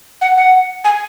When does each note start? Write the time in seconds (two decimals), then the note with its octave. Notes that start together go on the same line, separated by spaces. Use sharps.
0.21 F#5
0.37 F#5
0.84 G#5